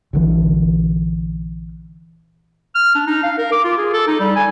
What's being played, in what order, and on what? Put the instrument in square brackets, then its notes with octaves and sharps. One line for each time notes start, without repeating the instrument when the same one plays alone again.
[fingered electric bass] A#1 D3 E3
[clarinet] F6
D4
D#4
F5
A#4
D6
F4
G#4
A4
D#4
G3
G#5